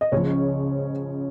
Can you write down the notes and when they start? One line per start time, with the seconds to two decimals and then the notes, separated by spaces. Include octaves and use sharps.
0.01 D#5
0.12 C#2 C#3 F3 C#4 C#5